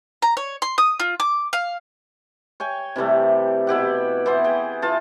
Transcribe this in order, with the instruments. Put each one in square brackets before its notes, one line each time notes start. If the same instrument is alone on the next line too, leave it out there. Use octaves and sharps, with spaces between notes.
[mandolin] A#5
C#5
C6
D#6
F4
D6
F5
[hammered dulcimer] C#5 G5 G#5
C3 E3 G3 A3
B2 E4 G4 F#5
E3 B3 C5
G#4 G5
E3 F4 A5